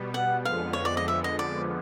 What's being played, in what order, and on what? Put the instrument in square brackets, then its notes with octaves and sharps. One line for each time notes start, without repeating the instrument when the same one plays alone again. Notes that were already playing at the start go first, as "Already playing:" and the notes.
Already playing: [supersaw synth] B2 G3 B3
[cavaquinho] F#5
[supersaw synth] F2 D3 F3 G#3 B3 [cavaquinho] F5
[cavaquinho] C#5
D5
D#5
E5
D#5
D5